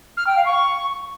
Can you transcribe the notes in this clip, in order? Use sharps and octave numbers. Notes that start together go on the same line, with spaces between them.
F6
G5
F5
C#6